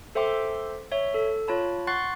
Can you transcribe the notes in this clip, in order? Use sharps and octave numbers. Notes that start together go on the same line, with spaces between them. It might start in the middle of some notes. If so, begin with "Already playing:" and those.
A4 C5 E5 G5 C6 D6
C#5 E5
A4
F4 C#5 A5 B5
F#5 C6 C#6 F#6 A6 C7